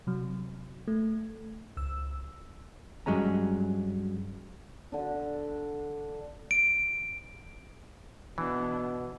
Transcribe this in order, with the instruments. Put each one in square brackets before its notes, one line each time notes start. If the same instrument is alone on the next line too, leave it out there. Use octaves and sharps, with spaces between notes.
[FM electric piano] C3 F#3
A3
C#2 E6
[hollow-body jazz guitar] G2 F#3 G#3 C#4 A#5
[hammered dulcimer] D3 D4
[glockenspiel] D7
[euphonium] B2 [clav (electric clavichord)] E3 [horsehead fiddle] B3 D4